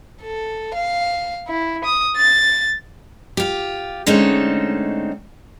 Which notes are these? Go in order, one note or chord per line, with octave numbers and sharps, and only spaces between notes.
A4
F5
E4
D#6
A6
F4 G4
D3 G#3 A3 C4 C#4 D#4